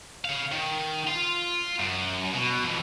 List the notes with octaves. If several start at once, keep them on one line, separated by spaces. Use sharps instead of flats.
C#5 F5
D#3
F4
F#2
B2
F2 E3